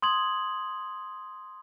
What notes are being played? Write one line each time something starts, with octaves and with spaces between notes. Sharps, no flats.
C6 D#6 G#6 F#7